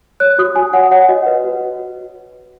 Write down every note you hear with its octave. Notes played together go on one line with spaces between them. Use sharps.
C#5 F#6
F#4 D#6
F#4 G#5
C#5 F#5
C#5 F#5
F#4 D#5
B4
F#4